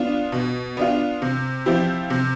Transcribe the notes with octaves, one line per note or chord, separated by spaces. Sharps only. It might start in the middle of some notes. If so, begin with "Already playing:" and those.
Already playing: B3 D4 F4
B2
B3 D4 F4
C3
F3 C4 E4 G4
C3